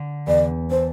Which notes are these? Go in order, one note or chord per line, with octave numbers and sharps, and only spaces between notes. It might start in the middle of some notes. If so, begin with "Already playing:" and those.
Already playing: D3
E2 D5
D4 C5